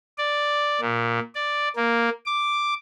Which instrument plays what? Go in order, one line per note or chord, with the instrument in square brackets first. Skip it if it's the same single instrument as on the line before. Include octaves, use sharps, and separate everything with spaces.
[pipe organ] D5
A#2
D5
A#3
D6